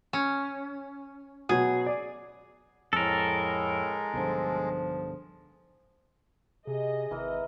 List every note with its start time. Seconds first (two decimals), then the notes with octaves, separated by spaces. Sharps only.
0.13 C#4
1.49 B2 F#3 G#4
1.86 D5
2.93 F2 A2 G#3 A4 A#4
4.14 B1 G2 D3 F3
6.67 C3 G#4 D#5
7.11 G#1 E3 A#4 A#5